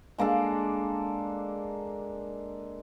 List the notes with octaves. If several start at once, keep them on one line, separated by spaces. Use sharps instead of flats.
G#3 A#3 D4 A4